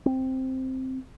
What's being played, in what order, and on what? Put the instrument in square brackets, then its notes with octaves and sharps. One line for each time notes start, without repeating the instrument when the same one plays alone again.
[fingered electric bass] C4